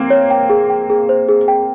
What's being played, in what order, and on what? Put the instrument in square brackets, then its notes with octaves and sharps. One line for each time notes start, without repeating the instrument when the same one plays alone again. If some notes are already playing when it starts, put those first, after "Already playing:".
Already playing: [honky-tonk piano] A#3 C4
[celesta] C#5
G5
G#4
G5
G#4
C5
G#4
G5